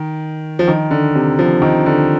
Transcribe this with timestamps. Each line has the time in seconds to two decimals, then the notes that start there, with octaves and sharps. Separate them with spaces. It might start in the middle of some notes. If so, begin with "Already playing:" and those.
Already playing: D#3
0.59 F3
0.68 D#3
0.91 D3
1.15 C3
1.39 F3
1.62 D#3
1.86 D3